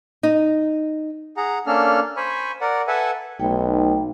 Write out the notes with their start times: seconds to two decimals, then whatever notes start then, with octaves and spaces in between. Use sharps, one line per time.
0.23 D#4
1.37 G#4 F#5 A#5
1.67 A#3 C#4 D4 A4 F6
2.17 C5 G#5 B5 C#6
2.61 A#4 D5 F#5
2.88 A4 B4 E5 F#5 G#5
3.40 B1 A3 D#4 G5